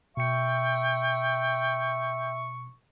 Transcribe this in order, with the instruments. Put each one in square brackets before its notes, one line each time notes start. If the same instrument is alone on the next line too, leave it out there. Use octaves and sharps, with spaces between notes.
[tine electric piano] B2 C#7 [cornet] E5 [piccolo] G5 [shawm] C#6